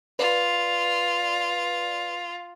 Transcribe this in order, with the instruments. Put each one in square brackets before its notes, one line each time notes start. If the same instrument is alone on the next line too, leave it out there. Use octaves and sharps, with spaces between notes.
[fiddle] F4 [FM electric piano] B4 D5